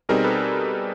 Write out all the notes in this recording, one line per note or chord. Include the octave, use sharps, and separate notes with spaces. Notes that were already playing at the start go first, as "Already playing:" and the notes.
B2 G3 C4 D#4 G#4 A#4
A4 B4